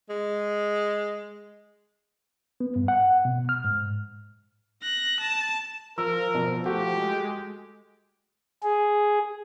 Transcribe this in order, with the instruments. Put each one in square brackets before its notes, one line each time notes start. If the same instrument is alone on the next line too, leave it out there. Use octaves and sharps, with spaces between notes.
[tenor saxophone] G#3
[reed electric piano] B3
G2
F#5
B2
F6
G#2
[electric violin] F#6 A#6
A5
[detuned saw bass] F3 [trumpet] A#4 [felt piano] E6
[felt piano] B2 [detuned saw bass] F3
[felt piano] A3 F#4 [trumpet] G4
[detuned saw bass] G#3
[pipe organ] G#4